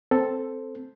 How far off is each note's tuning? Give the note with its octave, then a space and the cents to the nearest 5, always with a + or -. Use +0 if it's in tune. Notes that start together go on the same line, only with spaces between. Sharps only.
C4 +0 A4 +0 C5 +0